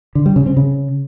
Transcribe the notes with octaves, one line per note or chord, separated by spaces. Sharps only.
D3
G3
C#3
C4
C#3